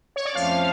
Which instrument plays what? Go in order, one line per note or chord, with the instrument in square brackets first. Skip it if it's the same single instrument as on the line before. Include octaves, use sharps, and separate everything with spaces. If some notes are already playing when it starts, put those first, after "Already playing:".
[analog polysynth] C#5
D5
[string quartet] F2 F3 A3 C#4 [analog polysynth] F5